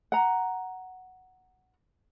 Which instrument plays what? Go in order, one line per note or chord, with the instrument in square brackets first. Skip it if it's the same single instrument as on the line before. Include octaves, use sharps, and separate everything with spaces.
[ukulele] F#5 A#5